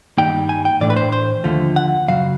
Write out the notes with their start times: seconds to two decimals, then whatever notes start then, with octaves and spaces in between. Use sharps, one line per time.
0.18 G2 D#3 G3 A#3 D#4 G5
0.49 G#5
0.65 G5
0.81 A2 E3 A3 D4 D5
0.90 B4
0.96 C5
1.12 C5
1.44 D#2 D3 F3 A3
1.76 F#5
2.08 F#2 C#3 F#3 F5